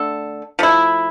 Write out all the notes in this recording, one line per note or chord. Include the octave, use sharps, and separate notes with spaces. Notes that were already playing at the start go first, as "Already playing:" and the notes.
Already playing: D3 A3 A4
F3 A3 E4